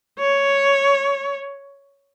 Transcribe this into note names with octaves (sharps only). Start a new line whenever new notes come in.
C#5